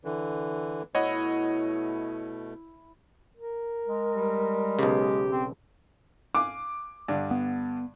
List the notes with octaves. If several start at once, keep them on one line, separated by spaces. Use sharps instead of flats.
D3 E3
B2 A3 E4 C#5 D#5 F#5
A#4
G#3
G3
B1 C#3 G4
C4
F5 G#5 D6 F#6
G2 D3
B3